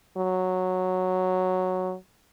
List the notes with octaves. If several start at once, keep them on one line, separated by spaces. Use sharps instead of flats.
F#3